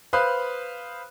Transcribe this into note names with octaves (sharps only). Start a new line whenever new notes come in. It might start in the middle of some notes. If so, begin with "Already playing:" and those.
B4 C5 F5 B5 D#6 F#6